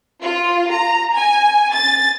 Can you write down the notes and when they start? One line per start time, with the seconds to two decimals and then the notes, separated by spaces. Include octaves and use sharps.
0.21 F4
0.70 A#5
1.13 G#5
1.71 A6